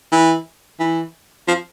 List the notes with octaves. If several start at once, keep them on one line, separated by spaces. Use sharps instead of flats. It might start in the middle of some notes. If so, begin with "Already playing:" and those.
E3
E3
F3